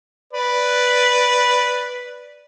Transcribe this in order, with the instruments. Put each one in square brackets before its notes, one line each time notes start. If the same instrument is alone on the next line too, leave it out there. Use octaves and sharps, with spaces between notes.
[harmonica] B4 D5